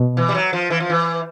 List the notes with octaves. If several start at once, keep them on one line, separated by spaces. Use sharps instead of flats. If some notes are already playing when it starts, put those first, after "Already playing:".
Already playing: B2
E3
G3
F#3
F3
E3
F3
E3